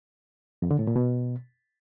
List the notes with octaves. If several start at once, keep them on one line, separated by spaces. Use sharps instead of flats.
F2
D3
A2
A#2
B2